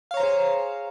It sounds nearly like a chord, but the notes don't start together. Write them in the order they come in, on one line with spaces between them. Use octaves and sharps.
F5 C#5 A#5 C5 G#4